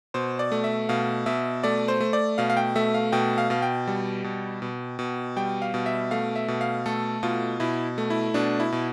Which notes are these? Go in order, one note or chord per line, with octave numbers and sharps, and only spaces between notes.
B2 C5
D5
A3
E5
B2 F5
B2 E5
A3 D5
C5
A3
D5
B2 F5
F5
G5
A3 E5
F5
B2 G5
F5
B2 F5
G5
G3
B2
B2
B2
G3 G5
F5
B2
E5
A3 F5
E5
B2
F5
A3 A4
B2 F4
B2 E4
A3
E4
B2 D4
E4
B2